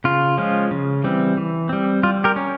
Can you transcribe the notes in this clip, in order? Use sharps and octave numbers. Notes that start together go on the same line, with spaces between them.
C#3 F4
F3 G#3 C#4
C#3
E3 G3 C4
E3
G3 C4
G3 F4
G4 A#4
C#4